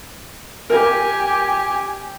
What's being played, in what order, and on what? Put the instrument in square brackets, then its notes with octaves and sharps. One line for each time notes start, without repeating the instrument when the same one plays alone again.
[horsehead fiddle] G4 G#5 [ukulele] A#4